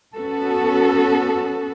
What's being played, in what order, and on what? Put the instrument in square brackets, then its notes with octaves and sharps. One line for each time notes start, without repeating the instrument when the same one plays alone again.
[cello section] B3 C#4 F#4 A4